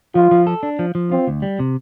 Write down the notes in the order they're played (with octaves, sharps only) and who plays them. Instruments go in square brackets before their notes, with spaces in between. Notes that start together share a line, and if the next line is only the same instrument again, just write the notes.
[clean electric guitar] F3 [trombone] F4
[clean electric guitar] F3
A4
D4
F3
F3
[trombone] C4 [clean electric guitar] F4
[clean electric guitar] D2
G3
C3